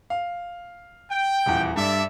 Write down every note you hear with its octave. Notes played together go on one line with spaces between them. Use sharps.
F5
G5
D#1 E2
G2 A4 D5 E5